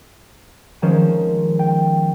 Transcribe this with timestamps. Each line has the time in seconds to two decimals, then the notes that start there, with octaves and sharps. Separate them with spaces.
0.82 D#3 F3 G#3 C#4 C5
1.59 G5